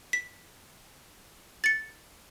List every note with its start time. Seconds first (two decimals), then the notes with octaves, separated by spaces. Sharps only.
0.13 B6
1.64 A6 C#7